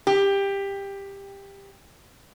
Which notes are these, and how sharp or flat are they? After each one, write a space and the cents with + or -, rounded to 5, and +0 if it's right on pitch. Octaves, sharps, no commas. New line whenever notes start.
G4 +15